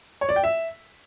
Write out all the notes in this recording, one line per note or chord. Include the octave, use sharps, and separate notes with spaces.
C#5
D5
G5
E5